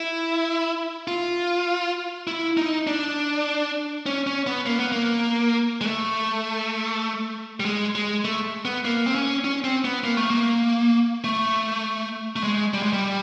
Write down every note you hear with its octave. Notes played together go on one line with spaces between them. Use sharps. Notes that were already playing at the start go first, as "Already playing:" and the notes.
Already playing: E4
F4
E4
D#4
D4
C#4
C#4
B3
A#3
B3
A#3
G#3
A3
G3
G#3
G#3
A3
B3
A#3
C4
C#4
C#4
C4
B3
A#3
A3
A#3
A3
A3
G#3
G3
G#3
G3